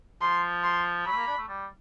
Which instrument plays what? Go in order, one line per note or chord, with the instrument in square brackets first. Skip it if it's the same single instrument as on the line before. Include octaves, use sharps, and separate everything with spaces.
[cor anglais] F3 [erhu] C6
[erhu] C6
[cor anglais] F#3 [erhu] B5
[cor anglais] A3
A#3
D4
A3
G3